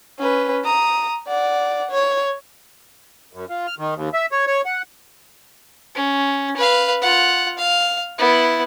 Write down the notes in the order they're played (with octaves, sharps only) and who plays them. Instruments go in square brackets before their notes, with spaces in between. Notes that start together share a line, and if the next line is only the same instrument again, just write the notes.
[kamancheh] C#4 B4
A#5 D#6
D5 F#5
C#5
[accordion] F#2
F4
F6
D#3
D#2
E5
C#5
C#5
F#5
[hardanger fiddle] C#4
B4 F5
F4 F#5
F5
B3 E4